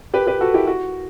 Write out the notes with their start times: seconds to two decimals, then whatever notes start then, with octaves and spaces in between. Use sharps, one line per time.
0.14 G4 B4
0.27 G4 B4
0.41 F#4 A4
0.54 E4 G4
0.67 F#4